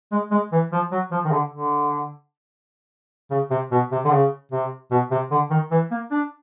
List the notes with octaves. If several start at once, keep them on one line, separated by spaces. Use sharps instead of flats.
G#3
G#3
E3
F3
F#3
F3
D#3
D3
D3
C#3
C3
B2
C3
D3
C#3
C3
B2
C3
D3
D#3
E3
A#3
D4